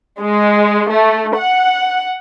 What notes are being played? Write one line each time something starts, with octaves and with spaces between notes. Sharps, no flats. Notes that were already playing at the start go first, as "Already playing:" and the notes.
G#3
A3
F#5